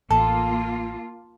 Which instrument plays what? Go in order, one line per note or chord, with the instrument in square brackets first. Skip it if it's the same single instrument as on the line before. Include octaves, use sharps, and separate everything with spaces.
[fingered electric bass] A1 [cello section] A#3 F4 [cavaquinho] A4 [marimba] A5